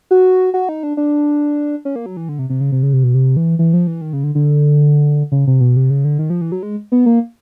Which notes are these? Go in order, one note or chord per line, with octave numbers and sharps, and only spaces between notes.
F#4
F#4
D#4
D4
D4
C#4
A#3
F#3
E3
D3
C3
C3
C#3
C3
C#3
C3
B2
C3
E3
E3
F3
E3
D#3
C#3
D3
D3
C#3
C3
B2
C3
C#3
D3
D#3
F3
E3
F#3
G#3
B3
A#3